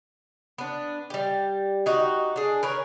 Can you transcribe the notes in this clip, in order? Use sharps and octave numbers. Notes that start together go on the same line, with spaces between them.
B3 D4
G3 G4
D#4 F#4 G4
D4 G#4
A#4 B4 C#5